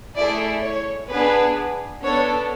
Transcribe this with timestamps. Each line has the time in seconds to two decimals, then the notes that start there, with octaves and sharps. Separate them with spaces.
0.16 A3 E4 G#4 D5
0.63 C#5
1.09 B3 D4 G#4 B4
2.03 B3 D4 A4 C#5